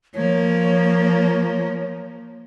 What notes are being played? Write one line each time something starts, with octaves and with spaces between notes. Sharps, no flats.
F3 A#3 C#5